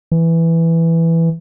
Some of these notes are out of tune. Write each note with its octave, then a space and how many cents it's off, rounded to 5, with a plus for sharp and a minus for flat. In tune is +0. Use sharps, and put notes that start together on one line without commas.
E3 +5